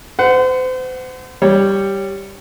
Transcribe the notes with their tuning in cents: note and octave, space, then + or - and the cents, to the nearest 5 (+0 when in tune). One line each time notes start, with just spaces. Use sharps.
C5 -35 F#5 +0
G3 +0 C#5 +0